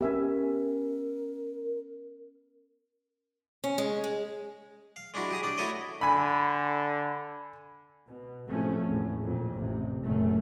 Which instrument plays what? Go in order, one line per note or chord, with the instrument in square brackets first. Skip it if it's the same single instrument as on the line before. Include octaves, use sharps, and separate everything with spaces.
[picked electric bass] B3 C#4 [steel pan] G4 E5 G#5 [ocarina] A#4
[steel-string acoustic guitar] C#4
G#3
G#3
[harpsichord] F5
G#3 D4 E4 F#4
G4 G#4 A#5
D4 D#4 D5
A3 E4 F#4 A4 C#5 D#5
[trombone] D3 [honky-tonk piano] G#5 B5
[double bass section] B2
A2 C3 F3 G#3 A3 C#4
G#1 E2 A2
F2 A#2 A#3
A1 C3
F#1 F#2 A#2 A3 C#4